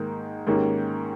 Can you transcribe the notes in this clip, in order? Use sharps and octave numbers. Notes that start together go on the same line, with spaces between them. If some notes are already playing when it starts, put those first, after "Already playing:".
Already playing: G#2 D#3 A#3 D#4
G#2 D#3 A#3 C#4 G4